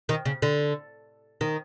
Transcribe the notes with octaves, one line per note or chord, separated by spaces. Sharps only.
D#3
C#3
D3
D#3